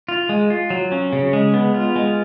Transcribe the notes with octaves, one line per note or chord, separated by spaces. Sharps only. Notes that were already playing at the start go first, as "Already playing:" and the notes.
F4
G#3
F4
F#3
C#4
C#3
G#3
B3
F4
G#3